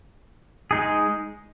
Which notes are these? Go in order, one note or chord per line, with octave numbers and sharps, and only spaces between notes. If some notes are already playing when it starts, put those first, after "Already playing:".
G#3 D#4 G#4